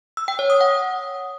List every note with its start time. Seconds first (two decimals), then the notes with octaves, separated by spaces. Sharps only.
0.17 E6
0.28 G5
0.39 C#5
0.50 D#6
0.61 F#5